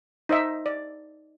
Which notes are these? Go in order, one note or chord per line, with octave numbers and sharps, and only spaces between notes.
D#4 C5 D#5 E5
D5